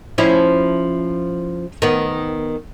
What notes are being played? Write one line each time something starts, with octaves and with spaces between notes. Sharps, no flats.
F3 C#4 E4
D#3 B3